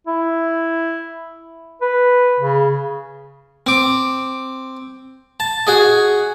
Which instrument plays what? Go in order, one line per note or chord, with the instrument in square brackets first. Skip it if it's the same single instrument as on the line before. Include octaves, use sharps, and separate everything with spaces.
[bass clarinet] E4
B4
C#3
[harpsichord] C4 D6
A5
F#4 G#4 D#5